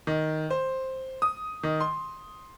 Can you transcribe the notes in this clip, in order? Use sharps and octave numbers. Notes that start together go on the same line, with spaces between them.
D#3
C5
D#6
D#3
C6